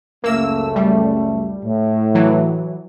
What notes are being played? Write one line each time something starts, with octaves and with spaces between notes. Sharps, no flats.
C#2 F#2 A3 A#3 E6
G3
A2
E3 F#3